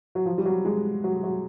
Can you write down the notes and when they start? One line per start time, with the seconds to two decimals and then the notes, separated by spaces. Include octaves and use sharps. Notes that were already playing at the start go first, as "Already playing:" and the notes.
0.15 F#3
0.26 F3
0.38 G3
0.45 F#3
0.65 G#3
1.04 F#3
1.23 F#3